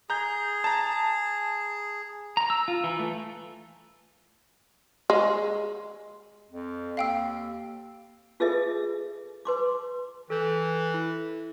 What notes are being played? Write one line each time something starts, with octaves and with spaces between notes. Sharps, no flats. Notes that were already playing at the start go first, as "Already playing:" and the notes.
G#4 A#5 G6
A5 A#5
A#5
E6
F4
E3
A3
G#3
F2
D#2 F5 G5 E6
F4 G#4 A4 B4 D#5 E5
B4 C6 D6
E3 A4 G6
E4